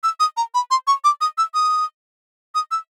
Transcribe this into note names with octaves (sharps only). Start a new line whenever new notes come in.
E6
D#6
A#5
B5
C6
C#6
D6
D#6
E6
D#6
D#6
E6